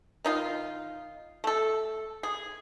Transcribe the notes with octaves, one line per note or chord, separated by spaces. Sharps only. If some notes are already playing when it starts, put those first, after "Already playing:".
D#3 D#4 F4
A3 A4
G#4